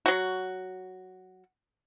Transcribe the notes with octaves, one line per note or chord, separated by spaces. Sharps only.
F#3 F#4